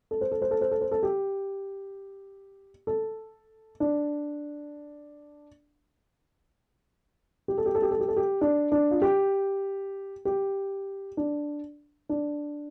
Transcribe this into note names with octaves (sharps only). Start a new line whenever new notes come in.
A4
C5
A4
C5
A4
C5
A4
C5
A4
G4
A4
D4
G4
A4
G4
A4
G4
A4
G4
A4
G4
D4
D4
F4
G4
G4
D4
D4